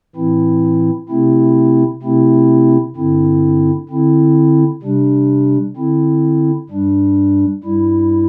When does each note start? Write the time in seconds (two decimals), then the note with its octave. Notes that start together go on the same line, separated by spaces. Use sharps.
0.15 A2 E3 C4 E4
1.09 C3 A3 C4 E4
2.03 C3 A3 C4 E4
2.96 G2 D3 C4 E4
3.89 D3 C4 E4
4.83 C3 G3 D4
5.77 D3 C4 E4
6.69 G2 G3 D4
7.63 G2 G3 E4